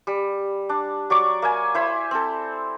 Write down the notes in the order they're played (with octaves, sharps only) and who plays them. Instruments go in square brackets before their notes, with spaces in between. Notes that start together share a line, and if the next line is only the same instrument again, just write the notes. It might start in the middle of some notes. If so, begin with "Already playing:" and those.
[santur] G3
D4
F#3 D5 C#6 D6
A#3 E5 G#5
E4 C5 B5
C4 A4